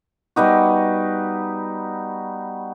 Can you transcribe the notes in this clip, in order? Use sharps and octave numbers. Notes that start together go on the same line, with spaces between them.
G3 B3 D#4 F#4